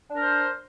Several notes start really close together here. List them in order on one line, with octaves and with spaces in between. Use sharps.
D4 A#4 C5